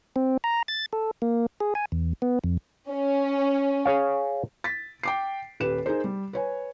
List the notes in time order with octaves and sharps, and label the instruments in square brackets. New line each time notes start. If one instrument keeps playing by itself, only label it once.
[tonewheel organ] C4
A#5
A6
A4
A#3
G#4
G#5
E2
B3
F2
[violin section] C#4
[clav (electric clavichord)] G#4 C#5 F5
[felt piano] A6 B6
G5 D6 C7
D#1 G4 B4 E7
D#4 G#4 A#4 C5
G3
B4 C#5 G#5